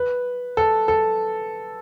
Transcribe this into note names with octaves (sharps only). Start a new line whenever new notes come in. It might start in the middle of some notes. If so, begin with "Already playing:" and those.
Already playing: B4
A4
A4